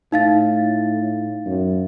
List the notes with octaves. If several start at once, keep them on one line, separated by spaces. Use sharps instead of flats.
A2 D#4 F5 A6
F#2